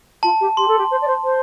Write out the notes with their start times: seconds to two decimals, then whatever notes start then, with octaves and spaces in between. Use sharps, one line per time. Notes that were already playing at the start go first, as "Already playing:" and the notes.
0.23 F4 A5
0.40 G4
0.57 G4 C6
0.67 A4
0.78 G4
0.90 C5
1.01 D5
1.07 C5
1.24 C5